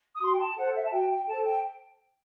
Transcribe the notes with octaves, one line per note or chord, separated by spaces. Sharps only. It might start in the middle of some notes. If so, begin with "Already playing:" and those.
D#6
F#4 C6
G5
A5
A4 C5 F#5
E5
A5
F#4 G5
G5
A4 C5 A5
G5